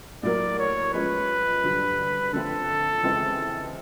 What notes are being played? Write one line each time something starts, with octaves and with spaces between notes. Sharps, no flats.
A2 F#3 A#3 D5
C#5
F3 G#3 C#4 B4
G2 D3 F#3
D3 F3 A3 C4 F4 A4
C#3 E3 G#3 C4